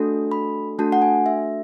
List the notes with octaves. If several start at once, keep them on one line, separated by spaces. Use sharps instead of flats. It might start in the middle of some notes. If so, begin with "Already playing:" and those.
Already playing: A3 D4 F#4 A4
B5
A3 D4 F#4 A4 A5
F#5
G#5
E5